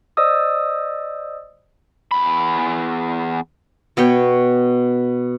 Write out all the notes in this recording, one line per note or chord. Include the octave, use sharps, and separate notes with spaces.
C5 D5 D#5 D#6 E6
E2 B5
B2 B3 C#5 G5